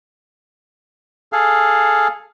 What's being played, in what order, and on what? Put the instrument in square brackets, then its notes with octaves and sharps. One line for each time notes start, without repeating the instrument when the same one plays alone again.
[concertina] G#4 A4 F5